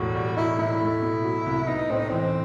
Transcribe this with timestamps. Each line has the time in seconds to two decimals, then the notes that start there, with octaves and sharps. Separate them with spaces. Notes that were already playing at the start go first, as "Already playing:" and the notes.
Already playing: E1 A2 F#4
0.15 G3
0.36 D#4 E4
0.59 A2 E4
0.80 A3
1.02 B2
1.24 F#3
1.46 C2
1.68 B3 D#4
1.90 A2 C4
1.99 D#4
2.09 E3 C4